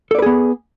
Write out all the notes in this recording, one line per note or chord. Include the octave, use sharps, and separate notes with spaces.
B3 G#4 A4 B4 D5